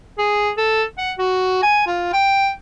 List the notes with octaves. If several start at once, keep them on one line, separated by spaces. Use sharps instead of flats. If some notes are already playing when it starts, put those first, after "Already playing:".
G#4
A4
F#5
F#4
G#5
F4
G5